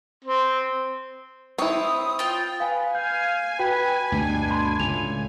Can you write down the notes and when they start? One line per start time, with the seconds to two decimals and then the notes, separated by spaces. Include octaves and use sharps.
0.24 C4
1.59 C4 E4 C#5 D#6
2.19 F4 G5
2.60 B4 F5 G#5
2.95 F5 G#5 G6
3.59 F#4 B4 G5
4.12 D2 G2 B2 D4
4.51 B5 C6
4.80 C#2 A2 F7